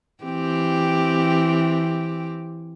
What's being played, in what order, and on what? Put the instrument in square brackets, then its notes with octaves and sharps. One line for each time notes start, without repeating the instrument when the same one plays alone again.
[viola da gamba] E3 C4 G4